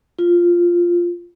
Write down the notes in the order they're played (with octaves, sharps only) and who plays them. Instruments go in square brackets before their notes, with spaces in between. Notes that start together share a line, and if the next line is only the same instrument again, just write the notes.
[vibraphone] F4